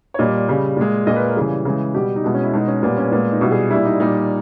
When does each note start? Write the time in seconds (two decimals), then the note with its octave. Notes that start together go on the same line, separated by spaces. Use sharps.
0.14 C#5
0.19 A#2 G3 D#5
0.48 C#3 G3
0.77 A#2 G#3
1.07 A#2 D#5
1.10 G#3 A#4
1.16 B4
1.26 A#4
1.36 C#3 E3 G3 G#4
1.65 C#3 E3 G#3
1.94 B2 G3 G4
2.16 D#4
2.24 B2 G#3 E4
2.34 C#4
2.43 E4
2.53 B2 G#3 D#4
2.68 C#4
2.82 A#2 G3 B3
2.97 C#4
3.12 A#2 G#3 B3
3.32 D#4
3.41 B2 G3 E4
3.51 G#4
3.70 A#2 G3 E4
3.85 D#4
3.99 A#2 G3 D#4